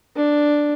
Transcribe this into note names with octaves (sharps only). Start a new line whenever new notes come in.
D4